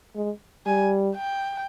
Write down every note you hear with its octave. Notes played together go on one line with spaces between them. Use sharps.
G#3
G3 G#5
G5